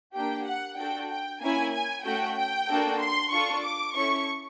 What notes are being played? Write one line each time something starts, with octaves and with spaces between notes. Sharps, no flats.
A#3 D4 G4 G5
F#5
D4 F#4 A4 G5
G5
A#3 C#4 E4 G#5
G#5
A3 C#4 F#4 G5
G5
A#3 D4 F#4 A4
C6
D4 F4 A4 C#6
D6
C#4 E4 A4 C#6